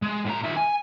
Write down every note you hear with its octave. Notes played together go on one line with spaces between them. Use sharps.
G#3
A2 A#5
D#3 E5
G#5